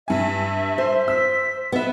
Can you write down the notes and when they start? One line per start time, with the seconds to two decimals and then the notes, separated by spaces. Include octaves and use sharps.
0.08 G2 E5 G#5
0.78 C5
1.08 E6 B6
1.72 B3 B4 E5